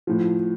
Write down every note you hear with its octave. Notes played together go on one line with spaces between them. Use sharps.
A2 F3